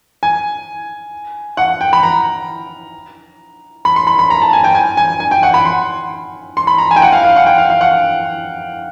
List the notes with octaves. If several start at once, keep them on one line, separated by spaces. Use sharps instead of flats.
G#5
F#5
G5
B5
A#5
B5
C6
B5
B5
A#5
A5
G#5
G5
G#5
G#5
G#5
G5
F#5
B5
C6
C6
B5
A#5
G#5
G5
F#5
F5
F5
F#5
G5
F5
F5
F#5